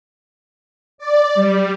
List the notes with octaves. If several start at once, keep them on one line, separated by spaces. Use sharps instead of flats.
D5
G3